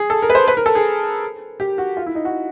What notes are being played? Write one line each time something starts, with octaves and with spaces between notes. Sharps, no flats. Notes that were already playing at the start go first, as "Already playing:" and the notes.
Already playing: G#4
A4
A#4
B4
C5
B4
A#4
A4
G#4
G4
F#4
F4
E4
D#4
F#4